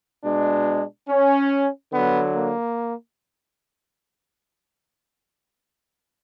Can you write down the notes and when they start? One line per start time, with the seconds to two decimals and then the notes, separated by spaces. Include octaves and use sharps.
0.24 B2 G#3 D4
1.08 C#4
1.92 D3 F#3 B3
2.35 A#3